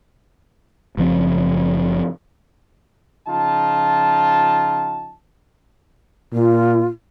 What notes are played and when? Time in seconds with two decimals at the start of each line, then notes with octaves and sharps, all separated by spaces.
0.97 F#1 C#3 F3 C4
3.28 C#3 F3 D#4 F4 A5
6.33 A#2 F4